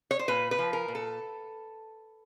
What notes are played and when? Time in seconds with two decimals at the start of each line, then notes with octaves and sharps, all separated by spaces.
0.11 C#5
0.19 C5
0.28 A#2 B4
0.51 B4
0.59 F3
0.73 A#4
0.88 A#2
0.95 A4